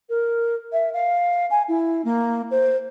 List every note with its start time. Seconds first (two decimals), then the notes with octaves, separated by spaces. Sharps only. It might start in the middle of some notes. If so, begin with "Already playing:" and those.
0.09 A#4
0.72 E5
0.93 F5
1.50 G#5
1.68 E4
2.04 A#3
2.51 C5